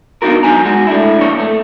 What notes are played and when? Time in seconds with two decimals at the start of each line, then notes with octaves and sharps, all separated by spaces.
0.22 B3 D4 D#4 F4 F#4 A#4
0.43 B2 F#3 D#4 G#5 A#5
0.65 G#3 F#4
0.87 A3 D4 E4
1.18 F2 A#2 C#5
1.40 A3